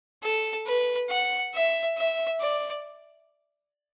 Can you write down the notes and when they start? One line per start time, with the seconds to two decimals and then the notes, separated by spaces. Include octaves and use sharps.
0.23 A4
0.67 B4
1.10 F#5
1.54 E5
1.97 E5
2.40 D5